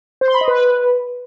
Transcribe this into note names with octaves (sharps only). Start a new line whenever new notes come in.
C5
C6
B5
D#5
B4